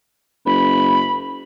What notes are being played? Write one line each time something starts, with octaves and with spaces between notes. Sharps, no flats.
F#1 B5